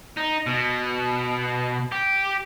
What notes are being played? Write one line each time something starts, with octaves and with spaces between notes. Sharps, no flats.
D#4
B2
G4